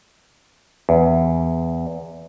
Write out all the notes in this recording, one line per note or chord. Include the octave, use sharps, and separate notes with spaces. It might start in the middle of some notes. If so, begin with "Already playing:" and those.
E2